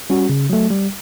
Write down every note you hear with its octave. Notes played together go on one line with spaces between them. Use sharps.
G3 C#4 F#4
C#3
F#3 A3
G3